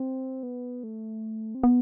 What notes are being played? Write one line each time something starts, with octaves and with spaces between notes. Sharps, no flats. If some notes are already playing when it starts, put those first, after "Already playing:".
Already playing: C4
B3
A3
C4
B3